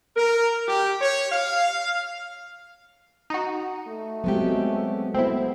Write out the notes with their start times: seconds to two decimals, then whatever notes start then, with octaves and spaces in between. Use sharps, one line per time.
0.16 A#4
0.67 G4
1.01 C#5
1.32 F5
3.30 D#4 F#4
3.88 A3
4.24 F#3 G#3 B3 C4 G4
5.14 A3 B3 C4 E4